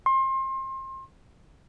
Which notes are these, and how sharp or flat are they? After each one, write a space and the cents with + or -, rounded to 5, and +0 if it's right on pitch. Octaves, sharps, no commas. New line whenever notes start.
C6 +30